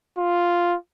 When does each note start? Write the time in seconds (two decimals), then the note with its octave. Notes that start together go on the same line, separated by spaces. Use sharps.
0.18 F4